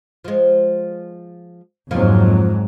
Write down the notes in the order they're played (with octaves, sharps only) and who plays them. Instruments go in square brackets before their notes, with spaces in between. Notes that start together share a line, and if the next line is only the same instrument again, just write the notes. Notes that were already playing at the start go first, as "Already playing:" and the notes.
[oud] F3 G#3
[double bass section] F2 G#2 F#3 [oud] F3 A#3 D#4